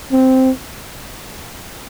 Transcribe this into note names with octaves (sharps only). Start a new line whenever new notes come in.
C4